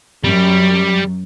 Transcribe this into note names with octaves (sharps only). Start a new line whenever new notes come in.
F#2 G3